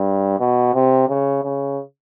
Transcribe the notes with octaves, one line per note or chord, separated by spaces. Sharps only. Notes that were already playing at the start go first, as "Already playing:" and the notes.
Already playing: G2
B2
C3
C#3
C#3